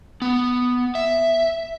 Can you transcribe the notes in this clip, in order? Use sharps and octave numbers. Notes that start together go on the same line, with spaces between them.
B3
E5